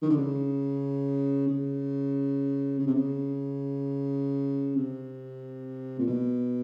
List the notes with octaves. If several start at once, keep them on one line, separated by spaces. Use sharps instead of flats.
D#3
D3
C#3
C#3
C#3
C3
C#3
C3
A#2
B2